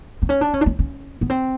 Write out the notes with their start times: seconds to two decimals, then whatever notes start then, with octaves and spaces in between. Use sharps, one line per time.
0.22 C4
0.29 C#4
0.41 D4
0.54 C#4
0.61 D4
0.66 C#4
0.79 C#4
1.21 B3
1.30 C4